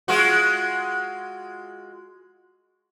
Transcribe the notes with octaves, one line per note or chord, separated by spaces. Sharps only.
G#3 F4 F#4